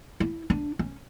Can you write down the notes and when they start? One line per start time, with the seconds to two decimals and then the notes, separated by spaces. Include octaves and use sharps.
0.20 E4
0.50 D4
0.79 C#4